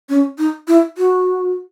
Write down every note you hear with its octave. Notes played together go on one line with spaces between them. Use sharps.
C#4
D#4
E4
F#4